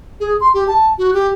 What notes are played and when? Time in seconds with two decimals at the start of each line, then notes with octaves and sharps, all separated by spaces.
0.20 G#4
0.41 C6
0.54 G4
0.68 A5
0.98 F#4
1.14 G4